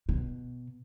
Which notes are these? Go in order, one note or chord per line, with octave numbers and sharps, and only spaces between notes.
B2